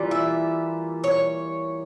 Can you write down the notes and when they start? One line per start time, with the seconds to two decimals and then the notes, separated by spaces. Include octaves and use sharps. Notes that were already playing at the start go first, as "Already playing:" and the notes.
Already playing: E3 G3 A#3 F4
0.11 E5
1.04 C#5